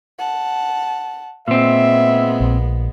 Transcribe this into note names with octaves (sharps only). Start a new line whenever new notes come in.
F#5 A5
A#2 G#3 B3 C4 E5
A#1